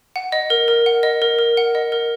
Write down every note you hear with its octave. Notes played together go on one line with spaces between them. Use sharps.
F#5
D#5
A#4
A#4
F#5
D#5
A#4
A#4
F#5
D#5
A#4